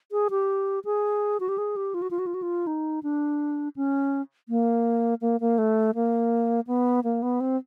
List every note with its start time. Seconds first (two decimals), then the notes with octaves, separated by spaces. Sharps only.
0.12 G#4
0.30 G4
0.85 G#4
1.40 F#4
1.49 G4
1.58 G#4
1.76 G4
1.94 F4
2.02 F#4
2.11 F4
2.19 F#4
2.26 F4
2.34 F#4
2.42 F4
2.67 D#4
3.03 D4
3.76 C#4
4.49 A#3
5.21 A#3
5.40 A#3
5.58 A3
5.95 A#3
6.67 B3
7.04 A#3
7.22 B3
7.40 C4